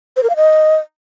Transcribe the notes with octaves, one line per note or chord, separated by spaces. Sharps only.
C5
A#4
F5
D#5